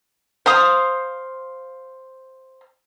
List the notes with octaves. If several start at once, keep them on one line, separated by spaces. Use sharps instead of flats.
C5 F5 D#6